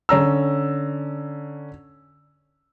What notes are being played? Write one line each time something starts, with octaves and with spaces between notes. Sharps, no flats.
D3 C#4 A#5 E6